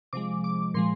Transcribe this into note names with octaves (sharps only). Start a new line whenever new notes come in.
C3 F3 G#3 D6
D6
A#2 F3 G#3 C6